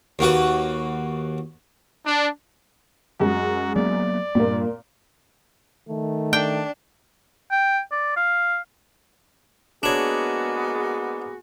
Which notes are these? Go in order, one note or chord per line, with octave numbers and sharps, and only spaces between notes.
D#2 A#3 F#4 B4
D4
F#2 G#3 F#4
F#3 A#3 B3 D5
G2 A#2 A#3
D#3 A3
D4 G5
G5
D5
F5
G#3 A#3 B3 D4 F#4 G#4 C#5